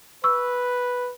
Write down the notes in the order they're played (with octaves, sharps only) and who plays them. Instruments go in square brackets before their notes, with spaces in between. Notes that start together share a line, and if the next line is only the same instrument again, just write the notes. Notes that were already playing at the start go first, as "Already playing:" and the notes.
[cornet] B4 [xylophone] C#6 E6